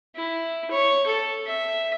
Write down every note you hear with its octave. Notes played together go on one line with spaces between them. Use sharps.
E4
C#5
A4
E5